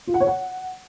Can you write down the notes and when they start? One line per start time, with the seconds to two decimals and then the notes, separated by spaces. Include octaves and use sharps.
0.07 F4
0.14 F#5
0.20 C#5
0.27 F#5